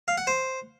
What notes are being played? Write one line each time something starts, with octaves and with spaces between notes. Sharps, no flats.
F5
F#5
C5